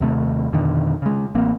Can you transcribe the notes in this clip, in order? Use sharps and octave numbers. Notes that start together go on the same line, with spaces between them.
D#2 C3 A3
F2 B2 D3 D#3
C#3 G#3
A1 A#3 C4